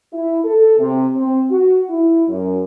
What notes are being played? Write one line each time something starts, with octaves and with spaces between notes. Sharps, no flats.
E4
A4
C3
C4
F#4
E4
F#2